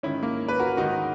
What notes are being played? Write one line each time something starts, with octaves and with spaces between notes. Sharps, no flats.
G#2 D#3 C#4 E4
A#3
B4
F#4 A#4
G#2 D#3 D#4 F#4